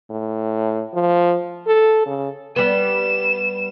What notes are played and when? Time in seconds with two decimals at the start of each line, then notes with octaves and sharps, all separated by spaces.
0.10 A2
0.94 F3
1.67 A4
2.06 C#3
2.56 G3 B3 E7